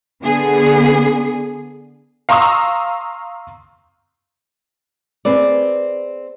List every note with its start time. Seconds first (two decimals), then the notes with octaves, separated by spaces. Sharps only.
0.23 D3 B3 G#4
2.29 F5 A#5 C6 C#6 D#6 E6
5.25 C4 G#4 B4 D5